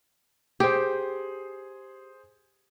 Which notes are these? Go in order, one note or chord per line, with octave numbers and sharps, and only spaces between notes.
G4 G#4 C5